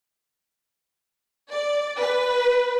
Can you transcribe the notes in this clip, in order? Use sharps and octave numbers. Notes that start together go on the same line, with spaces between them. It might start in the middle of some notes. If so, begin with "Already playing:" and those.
D5
B4